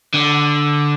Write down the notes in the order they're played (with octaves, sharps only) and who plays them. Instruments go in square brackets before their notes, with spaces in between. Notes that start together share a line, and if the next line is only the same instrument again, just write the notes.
[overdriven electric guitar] D3